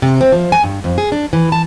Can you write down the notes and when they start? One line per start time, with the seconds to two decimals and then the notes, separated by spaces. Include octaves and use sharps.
0.02 C3
0.21 C4
0.32 F3
0.52 G#5
0.63 G2
0.84 F2
0.98 G#4
1.12 D4
1.33 E3
1.52 A5